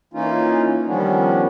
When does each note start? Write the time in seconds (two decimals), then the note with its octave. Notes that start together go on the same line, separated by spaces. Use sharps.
0.14 E3 A#3 C#4 D#4 F4
0.86 D#3 F3 G3 B3 C#4 D4